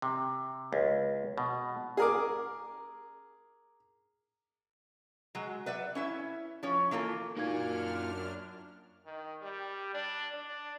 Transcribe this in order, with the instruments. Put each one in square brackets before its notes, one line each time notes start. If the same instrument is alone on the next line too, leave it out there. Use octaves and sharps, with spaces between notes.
[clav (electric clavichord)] C3
C#2
B2
[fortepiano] G#4 A#4 D6
[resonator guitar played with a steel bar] F#3 G#3
B4 D5 E5 F#5
C#4 E4 E5
F3 C#4 C#5
E3 A#3 F4 A4
[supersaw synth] F#2 D4 F6 [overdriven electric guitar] A#3 F4 [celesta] D#4 F#4 G#6
[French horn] D#3
G3
D4
D4